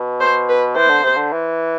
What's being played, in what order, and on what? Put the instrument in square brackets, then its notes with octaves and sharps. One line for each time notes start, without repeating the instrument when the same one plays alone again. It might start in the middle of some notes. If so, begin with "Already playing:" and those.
Already playing: [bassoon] B2
[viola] C5
B4
[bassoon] E3 [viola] C5
[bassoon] D3
C3
D3
E3